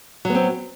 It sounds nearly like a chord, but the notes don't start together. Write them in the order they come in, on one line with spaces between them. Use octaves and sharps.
F#3 B3 C4